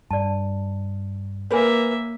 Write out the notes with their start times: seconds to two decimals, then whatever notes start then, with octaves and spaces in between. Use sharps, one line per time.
0.11 G2 D5 A5
1.51 A#3 A#4 B4 C#5 E5 G#5